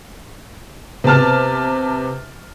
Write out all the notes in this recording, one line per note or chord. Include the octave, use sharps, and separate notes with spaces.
C3 B3 A5 F6